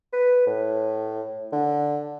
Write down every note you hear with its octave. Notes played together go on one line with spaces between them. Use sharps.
B4
A2
D3